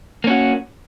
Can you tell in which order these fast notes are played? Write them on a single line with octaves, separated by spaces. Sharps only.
A#3 C#4 F#4